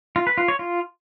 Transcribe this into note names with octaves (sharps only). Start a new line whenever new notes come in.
F4
B4
F4
C#5
F4